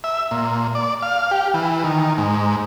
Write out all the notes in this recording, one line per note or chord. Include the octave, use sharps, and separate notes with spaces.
E5
A#2
D5
F5
G4
E3
D#3
G#2